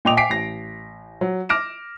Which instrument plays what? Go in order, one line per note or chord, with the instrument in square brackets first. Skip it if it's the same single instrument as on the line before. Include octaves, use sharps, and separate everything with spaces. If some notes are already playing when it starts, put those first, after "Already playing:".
[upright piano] A#2 D#5 G5 D6 D#6 F7
G5 G#5 D6 B6 C7 D7
A1 A#6
F#3
D6 F6 A#6 D7 E7